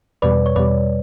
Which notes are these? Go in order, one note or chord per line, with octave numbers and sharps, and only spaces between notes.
E2 B2 G3 B4 D5
C#5
E2 B2 G3 B4 D5